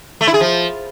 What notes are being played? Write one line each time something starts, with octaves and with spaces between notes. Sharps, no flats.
A3
E4
G#4
F3